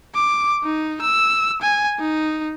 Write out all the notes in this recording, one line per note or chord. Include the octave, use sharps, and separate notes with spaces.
D6
D#4
E6
G#5
D#4